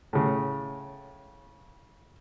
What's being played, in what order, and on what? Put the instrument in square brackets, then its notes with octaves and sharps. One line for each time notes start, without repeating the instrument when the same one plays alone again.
[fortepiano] A2 C#3